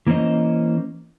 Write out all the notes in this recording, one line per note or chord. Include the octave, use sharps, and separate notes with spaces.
E3 A#3 C#4 C5 D#5